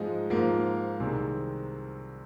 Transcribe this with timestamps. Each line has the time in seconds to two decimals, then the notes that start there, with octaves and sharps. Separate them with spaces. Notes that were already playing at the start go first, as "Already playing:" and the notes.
Already playing: G#2 F3 G#3 D#4
0.30 G#2 F3 A#3
1.00 C2 C3 D#3 G#3 C4